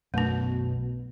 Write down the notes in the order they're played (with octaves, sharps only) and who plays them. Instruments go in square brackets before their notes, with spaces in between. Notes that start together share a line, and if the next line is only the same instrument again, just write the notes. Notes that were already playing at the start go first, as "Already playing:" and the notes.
[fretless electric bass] B1 F#2 [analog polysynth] B2 [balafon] A3 D4